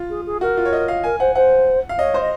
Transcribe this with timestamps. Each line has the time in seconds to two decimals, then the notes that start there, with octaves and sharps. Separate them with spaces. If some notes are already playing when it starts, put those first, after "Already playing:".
Already playing: F4
0.10 G#4
0.26 G#4
0.41 F#4 A#4
0.57 F4
0.65 C#5
0.73 D#5
0.88 F5
1.04 A#4 G#5
1.20 C5 F#5
1.35 C5 F#5
1.89 F5
1.98 C#5 D#5
2.14 C5
2.20 D#5